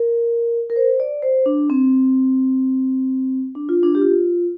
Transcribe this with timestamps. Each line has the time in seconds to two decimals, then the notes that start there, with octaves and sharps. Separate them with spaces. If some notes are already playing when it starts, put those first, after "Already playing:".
Already playing: A#4
0.70 A#4
0.76 C5
1.00 D5
1.23 C5
1.46 D4
1.70 C4
3.55 D4
3.69 F4
3.83 D4
3.95 G4
4.02 F4